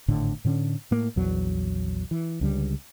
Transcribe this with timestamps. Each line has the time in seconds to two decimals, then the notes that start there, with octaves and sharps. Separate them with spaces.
0.08 G#1 A2 D3 A3
0.45 A2 D3 C4 C#4
0.91 A2 A#3
1.16 A#1 E2 F#3
2.11 E3
2.41 C#2 D3 F#3 G3